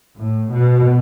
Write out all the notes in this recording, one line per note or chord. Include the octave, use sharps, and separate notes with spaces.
A2
B2